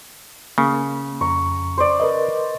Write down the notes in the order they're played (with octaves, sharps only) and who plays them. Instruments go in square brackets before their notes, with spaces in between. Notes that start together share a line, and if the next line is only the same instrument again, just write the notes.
[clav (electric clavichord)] C#3 [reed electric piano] A#3
[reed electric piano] F2 A#5 [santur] C#6
[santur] C5 D5
[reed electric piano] A#4 B4 D#5